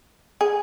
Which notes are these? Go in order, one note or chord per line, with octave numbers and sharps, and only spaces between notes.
G#4